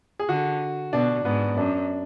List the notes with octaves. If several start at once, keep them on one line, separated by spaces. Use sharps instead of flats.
G#4
D3 F#4
B2 D4
G#2 B3
F#2 D4